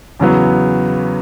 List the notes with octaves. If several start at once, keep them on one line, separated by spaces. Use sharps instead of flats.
E2 C#3 F#3 B3